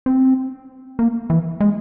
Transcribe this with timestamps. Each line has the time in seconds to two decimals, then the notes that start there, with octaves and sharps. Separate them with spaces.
0.06 C4
0.99 A#3
1.30 E3
1.61 G#3